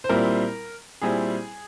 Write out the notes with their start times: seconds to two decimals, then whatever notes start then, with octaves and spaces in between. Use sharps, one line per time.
0.04 C5
0.09 A#2 G3 C4 E4 A#4
1.01 A#2 G3 C4 E4 G#4